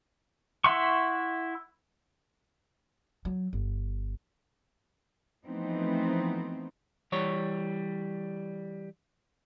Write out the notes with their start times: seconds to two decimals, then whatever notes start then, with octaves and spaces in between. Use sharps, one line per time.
0.64 E4 E5 F#5 C6 C#6
3.25 F#3
3.53 G1
5.46 E3 F3 A3 B3 C4 D#4
7.12 E3 G3 C#5